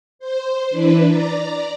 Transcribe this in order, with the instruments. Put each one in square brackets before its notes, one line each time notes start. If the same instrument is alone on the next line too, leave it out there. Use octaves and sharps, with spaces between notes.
[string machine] C5
E3 D4 B4
D5 A#5